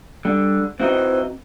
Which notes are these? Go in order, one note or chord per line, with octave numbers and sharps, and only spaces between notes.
D3 G3
E3 C4 D#4 F#4 C5 D#5